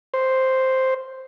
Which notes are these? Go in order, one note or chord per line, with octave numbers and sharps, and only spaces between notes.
C5